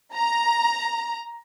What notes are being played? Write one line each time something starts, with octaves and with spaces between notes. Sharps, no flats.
A#5